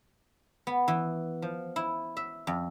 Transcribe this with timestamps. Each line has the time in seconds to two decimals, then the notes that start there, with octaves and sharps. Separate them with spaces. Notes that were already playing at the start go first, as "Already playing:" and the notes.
0.67 B3
0.88 E3
1.42 F3
1.76 E4
2.17 E5
2.47 F2